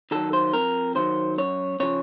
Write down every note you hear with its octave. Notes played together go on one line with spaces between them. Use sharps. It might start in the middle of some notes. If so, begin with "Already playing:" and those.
D#3 F#3 A4
C5
F2 A#4
D#3 F#3 C5
F#2 C#5
C#3 F3 C#5